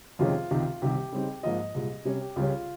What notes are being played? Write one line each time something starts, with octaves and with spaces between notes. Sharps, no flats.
F2 C3 D#3 G#3 C#4 F4
C#2 C3 D#3
C2 C3 D#3 G4
C#3 G3 C4 D#4
G#2 F3 A#3 F4 D#5
C2 A#2 G#3
C3 G3 C#4 C#5
G4
C#2 C#3 G3 C#4 F4